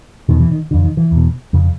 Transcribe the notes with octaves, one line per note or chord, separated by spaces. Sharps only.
E2 B2 D#3
E3
D#3
F2 D3
D#3
E3
E2 B2
F2 C#3